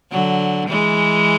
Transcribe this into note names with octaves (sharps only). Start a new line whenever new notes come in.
D3 F#3
E3 G#3